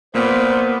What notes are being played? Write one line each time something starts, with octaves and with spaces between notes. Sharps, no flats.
A#2 A#3 B3 C5